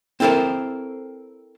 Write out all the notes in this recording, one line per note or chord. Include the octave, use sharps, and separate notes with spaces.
C4 E4 A4 A#4 C5